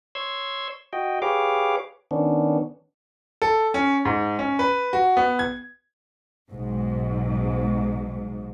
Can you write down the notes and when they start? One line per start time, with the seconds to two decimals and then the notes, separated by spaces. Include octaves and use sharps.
0.15 C#5 C6 E6 G#6
0.93 F#4 D#5 G5
1.22 G4 G#4 B4 C#5 F5 D6
2.11 D#3 B3 C#4 D4
3.42 A4
3.74 C#4
4.05 G#2
4.39 C#4
4.59 B4
4.93 F#4
5.17 B3
5.39 G#6
6.50 B1 G#2